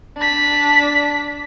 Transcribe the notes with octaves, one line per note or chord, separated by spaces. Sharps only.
D4 B6